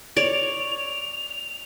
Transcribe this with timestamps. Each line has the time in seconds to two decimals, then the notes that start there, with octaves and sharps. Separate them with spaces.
0.17 C#5 D5 F7